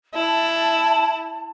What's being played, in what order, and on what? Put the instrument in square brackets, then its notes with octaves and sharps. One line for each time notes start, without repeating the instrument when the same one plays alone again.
[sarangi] E4 [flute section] A5